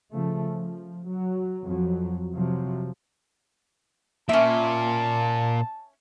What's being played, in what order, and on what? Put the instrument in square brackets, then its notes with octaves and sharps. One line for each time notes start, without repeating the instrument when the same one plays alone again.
[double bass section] C#3 F3 A3
F3
F#3
F2 F#3
C3 F3 F#3
[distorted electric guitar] A#2 [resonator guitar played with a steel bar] C#4 E5 [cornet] A5